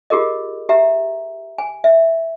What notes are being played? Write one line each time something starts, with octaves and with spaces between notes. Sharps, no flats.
F4 G4 G#4 A#4 D#5
G4 E5 A#5
G#5
E5